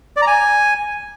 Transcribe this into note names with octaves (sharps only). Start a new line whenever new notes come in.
D5
A#5
G#5